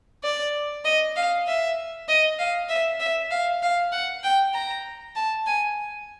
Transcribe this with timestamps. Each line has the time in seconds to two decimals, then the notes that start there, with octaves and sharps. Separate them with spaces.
0.24 D5
0.85 D#5
1.16 F5
1.47 E5
2.08 D#5
2.39 F5
2.69 E5
3.00 E5
3.31 F5
3.62 F5
3.92 F#5
4.23 G5
4.54 A#5
5.16 A5
5.46 G#5